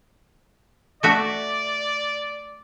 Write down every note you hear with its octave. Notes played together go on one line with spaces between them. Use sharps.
A3 F#4 D5 E5